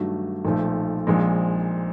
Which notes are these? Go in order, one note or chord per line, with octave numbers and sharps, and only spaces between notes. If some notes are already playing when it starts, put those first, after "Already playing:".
Already playing: G2 D#3 F#3 A3
B1 A#2 F3 A3
A#1 A#2 F3 G#3